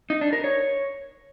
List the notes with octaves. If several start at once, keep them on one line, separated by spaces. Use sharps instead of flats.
D#4
D4
A#4
C#5